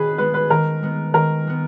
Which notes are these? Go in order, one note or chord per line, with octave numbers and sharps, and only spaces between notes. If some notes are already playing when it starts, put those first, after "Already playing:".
Already playing: D#3 G#4 B4
G#3 B3 B4
B4
D#3 A#4
G#3 B3
D#3 A#4
G#3 B3